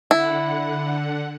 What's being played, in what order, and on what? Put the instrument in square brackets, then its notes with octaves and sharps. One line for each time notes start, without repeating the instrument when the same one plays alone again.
[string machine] D3 F#5 [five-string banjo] E4